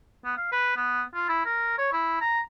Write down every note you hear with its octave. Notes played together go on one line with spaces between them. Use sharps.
B3
F5
B4
B3
F4
E4
A#4
C#5
E4
A#5